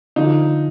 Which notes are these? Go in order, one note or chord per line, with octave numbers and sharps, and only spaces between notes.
D3 F3 D#4